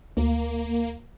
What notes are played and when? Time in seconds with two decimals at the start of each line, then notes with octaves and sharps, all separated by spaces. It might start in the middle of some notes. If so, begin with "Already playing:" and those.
0.17 D2 A#3